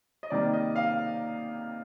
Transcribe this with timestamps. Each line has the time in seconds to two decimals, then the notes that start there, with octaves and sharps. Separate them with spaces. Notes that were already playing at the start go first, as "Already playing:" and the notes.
0.23 D#5
0.30 C3 D#3 G3 A#3 D5
0.53 D#5
0.76 F5